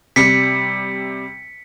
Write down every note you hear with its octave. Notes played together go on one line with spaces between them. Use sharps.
C3 G3 B6 C#7